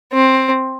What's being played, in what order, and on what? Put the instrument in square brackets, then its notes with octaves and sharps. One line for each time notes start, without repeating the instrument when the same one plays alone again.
[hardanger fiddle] C4